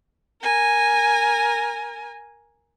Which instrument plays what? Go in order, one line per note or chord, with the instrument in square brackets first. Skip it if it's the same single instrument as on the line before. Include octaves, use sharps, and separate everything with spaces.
[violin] A#4 G#5